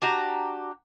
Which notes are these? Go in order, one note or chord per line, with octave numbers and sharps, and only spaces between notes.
D4 F#4 G4 A#5